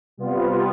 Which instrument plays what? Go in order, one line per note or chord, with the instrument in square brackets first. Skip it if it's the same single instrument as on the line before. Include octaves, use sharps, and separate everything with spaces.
[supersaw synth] C3 G3 B3 F4